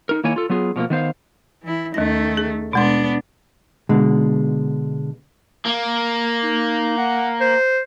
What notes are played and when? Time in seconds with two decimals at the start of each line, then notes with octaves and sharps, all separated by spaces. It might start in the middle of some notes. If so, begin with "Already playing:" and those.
0.09 D#4 A#4
0.24 D#3 A#3 E4 C#5 G#5
0.36 F4 A4
0.49 F#3 B3 F4 G#4
0.76 B2 F3 G#3 A#3
0.90 D#3 B3 C5 F5
1.63 E3 E4
1.94 D#2 D#3 A3 A#6
2.37 G#4
2.73 B2 G#3 B3 D4 C6
3.89 B2 D3 G#3
5.65 A#3
6.43 D#4
6.98 F#5
7.41 C5